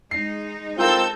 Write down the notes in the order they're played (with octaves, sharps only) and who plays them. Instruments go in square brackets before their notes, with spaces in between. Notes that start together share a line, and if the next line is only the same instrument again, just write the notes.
[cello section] G#3 D#4 [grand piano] C7
[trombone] C4 [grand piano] F4 A#4 F5 [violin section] A4 E6 G6